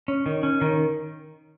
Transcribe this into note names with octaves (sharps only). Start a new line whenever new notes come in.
C#4
D#3
C#4
D#3